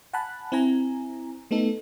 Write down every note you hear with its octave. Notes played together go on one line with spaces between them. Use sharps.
F#5 G#5 A5 B5 F#6
C4 E4 G#5 A#5
A3 B3 D#4 A4